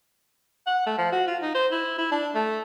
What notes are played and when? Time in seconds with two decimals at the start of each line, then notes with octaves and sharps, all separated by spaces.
0.67 F#5
0.86 A3
0.98 F3
1.12 F#4
1.27 F4
1.42 D#4
1.55 C5
1.72 E4
1.98 E4
2.12 D4
2.35 A3